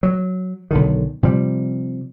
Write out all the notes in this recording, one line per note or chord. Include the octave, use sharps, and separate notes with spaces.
F#3
B1 D3 D#3
C3 F3 G3